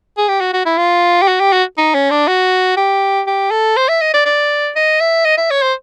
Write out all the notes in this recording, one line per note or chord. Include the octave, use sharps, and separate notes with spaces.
G#4
G4
F#4
F#4
E4
F4
G4
F#4
G4
F#4
D#4
C#4
D4
F#4
G4
G4
A4
C5
E5
D#5
D5
D5
D#5
E5
D#5
E5
C#5
C5